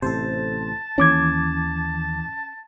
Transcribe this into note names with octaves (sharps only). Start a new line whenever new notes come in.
A1 C3 A4 C5 A5
D#2 E3 C#4 D6 G#6